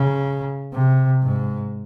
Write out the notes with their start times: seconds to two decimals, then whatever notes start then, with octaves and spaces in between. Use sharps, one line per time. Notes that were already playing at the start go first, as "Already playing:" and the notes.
Already playing: C#3
0.73 C3
1.23 G#2